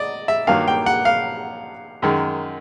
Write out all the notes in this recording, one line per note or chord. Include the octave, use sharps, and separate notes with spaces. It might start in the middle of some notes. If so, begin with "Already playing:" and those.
Already playing: D5 D#5
E5
G2 D#3 F#3 A#3 F5
G5
F#5
F5
F#2 D#3 G#3